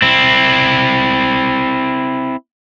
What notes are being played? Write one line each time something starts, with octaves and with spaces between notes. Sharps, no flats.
C4 E4